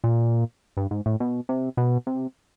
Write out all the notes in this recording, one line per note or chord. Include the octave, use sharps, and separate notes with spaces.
A#2
G2
G#2
A2
B2
C3
B2
C3